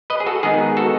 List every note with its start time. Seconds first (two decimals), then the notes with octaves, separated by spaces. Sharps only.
0.10 B4 D#5
0.20 G#4
0.26 F#4 A4
0.43 D#3 G#3 B3 D#4 G#4
0.77 F#4 A4